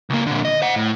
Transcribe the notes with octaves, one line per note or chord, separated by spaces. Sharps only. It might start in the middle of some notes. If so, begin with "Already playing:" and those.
C#2 A#3
A#2 D3
D#5
C5 F#5
A2